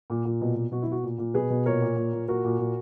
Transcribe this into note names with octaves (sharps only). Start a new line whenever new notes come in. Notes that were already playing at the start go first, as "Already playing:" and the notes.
A#2
A#2
B2
B2
B2 F#4
E4
B2 F#4
A#2
A#2
B2 G#4 B4
B2
A#2 A#4 C#5
A#2
A#2
A#2
A#2 F#4 A#4
A#2
A#2